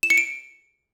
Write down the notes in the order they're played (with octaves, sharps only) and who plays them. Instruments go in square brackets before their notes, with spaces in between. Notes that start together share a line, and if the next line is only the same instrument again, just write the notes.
[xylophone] E7
C#7
D7